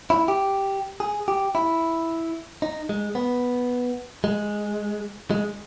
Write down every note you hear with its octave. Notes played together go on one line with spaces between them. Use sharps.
E4
G4
G#4
G4
E4
D#4
G#3
B3
G#3
G#3